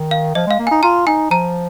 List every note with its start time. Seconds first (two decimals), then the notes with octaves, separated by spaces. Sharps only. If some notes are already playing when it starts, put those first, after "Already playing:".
Already playing: D#3
0.11 F5
0.35 F3 D#5
0.47 G#3 F5
0.59 A#3
0.67 D#4 G#5
0.83 F4 A#5
1.07 D#4 G#5
1.31 F3 A#5